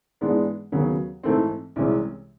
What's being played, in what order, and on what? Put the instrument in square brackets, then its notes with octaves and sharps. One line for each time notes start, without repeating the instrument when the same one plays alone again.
[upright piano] G#2 E3 G#3 B3 D4
D#2 C#3 F#3 B3
G#2 E3 A3 C4
C2 C3 E3 G#3 C#4